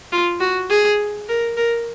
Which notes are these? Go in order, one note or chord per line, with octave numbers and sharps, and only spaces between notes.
F4
F#4
G#4
A#4
A#4